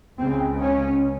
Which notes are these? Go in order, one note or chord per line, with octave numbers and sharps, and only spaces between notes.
C#2 C#3 C4
C#4